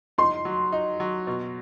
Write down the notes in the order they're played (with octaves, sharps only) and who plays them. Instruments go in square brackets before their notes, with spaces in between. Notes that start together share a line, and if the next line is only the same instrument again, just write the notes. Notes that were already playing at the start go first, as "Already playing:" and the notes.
[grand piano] D#4 [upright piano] C6
[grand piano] F#3
D#4
F#3
B2